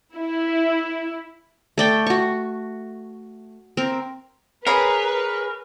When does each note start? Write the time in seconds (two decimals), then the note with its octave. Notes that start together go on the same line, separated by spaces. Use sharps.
0.17 E4
1.78 A3 D5 G5
2.06 F#4 C#6
3.77 C4 A#4
4.67 G#4 A#4 B4 C#5 B5